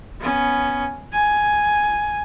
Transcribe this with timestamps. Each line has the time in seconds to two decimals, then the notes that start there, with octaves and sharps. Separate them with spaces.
0.21 B3 C#4
1.13 G#5